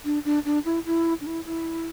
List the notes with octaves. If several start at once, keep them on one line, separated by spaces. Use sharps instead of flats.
D4
D4
D4
E4
E4
D4
E4
E4